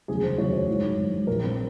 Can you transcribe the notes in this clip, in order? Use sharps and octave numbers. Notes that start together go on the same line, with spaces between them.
F1 D#2 C#3 F#3 G#4
C5
F1 D#2 C#3 F#3 C#5
C#5
G#1 G#2 F#3
G#1 G#2 F#3
A#1 A#2 F3 A#4
C4